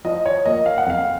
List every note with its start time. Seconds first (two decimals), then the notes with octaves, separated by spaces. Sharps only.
0.05 F3 D#5
0.26 C#5
0.46 A#3 D#5
0.66 F5
0.78 F#5
0.86 F2 F5